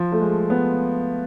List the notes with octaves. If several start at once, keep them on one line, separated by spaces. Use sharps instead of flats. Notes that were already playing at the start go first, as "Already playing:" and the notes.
Already playing: F3
A3
G#3
B3